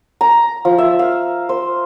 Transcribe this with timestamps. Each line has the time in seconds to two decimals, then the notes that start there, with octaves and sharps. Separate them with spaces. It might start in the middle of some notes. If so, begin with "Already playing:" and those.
0.21 A#5
0.65 F3
0.78 E5
0.99 F5
1.49 C5